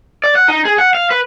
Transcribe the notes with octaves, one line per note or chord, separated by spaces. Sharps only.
D5
F#5
D#4
G#4
F#5
F5
B4